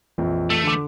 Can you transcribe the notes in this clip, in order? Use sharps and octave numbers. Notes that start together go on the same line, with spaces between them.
A#1 F2 E3
A3
D3 D6